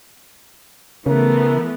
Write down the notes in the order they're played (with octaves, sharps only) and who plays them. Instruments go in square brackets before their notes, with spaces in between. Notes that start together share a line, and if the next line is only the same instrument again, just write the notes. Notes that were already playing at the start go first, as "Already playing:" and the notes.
[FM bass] C#3 [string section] E3 A3 B3 [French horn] A#4